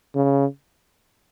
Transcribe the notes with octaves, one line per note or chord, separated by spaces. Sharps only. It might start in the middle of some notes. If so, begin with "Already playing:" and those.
C#3